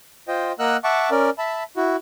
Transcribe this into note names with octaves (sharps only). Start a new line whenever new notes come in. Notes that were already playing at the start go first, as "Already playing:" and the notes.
F4 C5 D#5 G5
A#3 A#4 D#5 F#5 E6 F#6
E5 F#5 A5 C#6 D6
C#4 A#4 D5
E5 A5 B5
E4 F#4